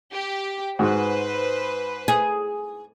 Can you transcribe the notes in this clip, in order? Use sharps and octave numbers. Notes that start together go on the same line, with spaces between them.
G4
G#2 G#3 F#4 B4 C5
G#4